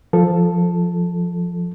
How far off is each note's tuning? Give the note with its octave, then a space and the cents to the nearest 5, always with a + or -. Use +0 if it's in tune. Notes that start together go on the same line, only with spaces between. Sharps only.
F3 +0 A4 +0